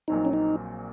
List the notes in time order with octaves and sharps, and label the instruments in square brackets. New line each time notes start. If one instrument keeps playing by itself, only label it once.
[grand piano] A#1 A#2 F#3 C4 [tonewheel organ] D#4
[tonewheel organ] C#4
D#4